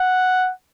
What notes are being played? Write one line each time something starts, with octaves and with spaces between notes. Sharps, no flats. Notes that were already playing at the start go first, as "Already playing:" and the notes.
Already playing: F#5